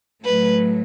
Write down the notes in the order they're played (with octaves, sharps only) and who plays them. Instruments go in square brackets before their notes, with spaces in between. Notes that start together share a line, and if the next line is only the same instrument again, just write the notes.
[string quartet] A2 F#3 A3 B4